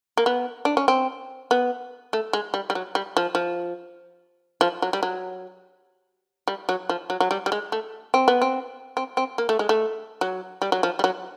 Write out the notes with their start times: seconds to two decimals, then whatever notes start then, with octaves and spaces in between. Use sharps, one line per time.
0.17 A#3
0.26 B3
0.65 D4
0.77 C#4
0.88 C4
1.51 B3
2.13 A3
2.33 G#3
2.54 G3
2.70 G3
2.75 F#3
2.95 G3
3.17 F3
3.35 F3
4.61 F3
4.82 F#3
4.93 G3
5.03 F#3
6.48 G3
6.69 F#3
6.89 F3
7.10 F#3
7.20 F#3
7.31 G3
7.46 G3
7.52 G#3
7.72 A3
8.14 C4
8.28 B3
8.42 C4
8.97 C4
9.17 C4
9.38 A#3
9.49 A3
9.59 G#3
9.69 A3
10.21 F#3
10.62 G3
10.72 F#3
10.83 F3
10.99 G3
11.04 F#3